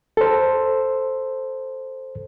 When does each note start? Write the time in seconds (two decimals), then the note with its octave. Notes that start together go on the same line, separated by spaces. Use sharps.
0.17 A4 C5